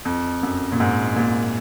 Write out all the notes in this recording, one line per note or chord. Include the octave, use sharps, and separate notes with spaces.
F2
F#2
A#2
G#2
A#2